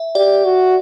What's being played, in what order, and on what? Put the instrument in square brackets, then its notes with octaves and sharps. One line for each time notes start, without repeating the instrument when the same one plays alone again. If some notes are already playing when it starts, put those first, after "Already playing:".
Already playing: [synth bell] E5
[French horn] G4 [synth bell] D5
[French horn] F#4